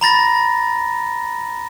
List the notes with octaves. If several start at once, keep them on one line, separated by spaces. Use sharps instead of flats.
A#5 B5 A6 A#6